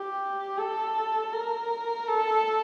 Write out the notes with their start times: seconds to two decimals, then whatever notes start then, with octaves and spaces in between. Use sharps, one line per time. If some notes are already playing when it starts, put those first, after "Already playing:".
Already playing: G4
0.58 A4
1.33 A#4
2.07 A4